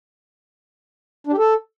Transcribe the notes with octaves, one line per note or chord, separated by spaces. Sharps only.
D4
G4
A4